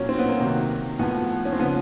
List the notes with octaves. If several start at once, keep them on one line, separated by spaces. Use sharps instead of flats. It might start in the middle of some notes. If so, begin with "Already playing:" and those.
Already playing: A#2 F#3 C#4
C4
B3
A#3
C3 D#3 F#3
A2 F3 B3
C#4
C4
C#3 F3 B3